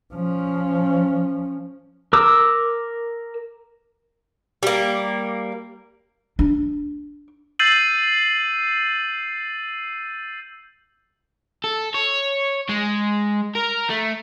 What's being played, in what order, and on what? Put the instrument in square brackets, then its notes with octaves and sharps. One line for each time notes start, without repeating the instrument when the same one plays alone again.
[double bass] F3 C#4
[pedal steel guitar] A#4 D6 E6
[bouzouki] G3 A#3
[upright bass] D4
[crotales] E6 G6 A6 C7 D#7 F#7
[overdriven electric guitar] A4
C#5
G#3
A#4
A3